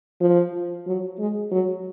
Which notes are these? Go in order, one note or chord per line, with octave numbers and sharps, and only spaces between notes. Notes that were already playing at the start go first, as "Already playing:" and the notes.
F3
F#3
G#3
F#3